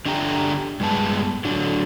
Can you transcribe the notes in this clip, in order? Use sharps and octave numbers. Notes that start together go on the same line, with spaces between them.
D3 D4 G4 E5 A#5
G2 G#3 B3 A5
D3 F#3 D4